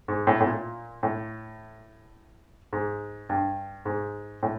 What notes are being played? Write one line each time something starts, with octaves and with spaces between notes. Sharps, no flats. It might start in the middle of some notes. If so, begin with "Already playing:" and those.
G#2
A2
A2
A#2
A2
G#2
G2
G#2
A2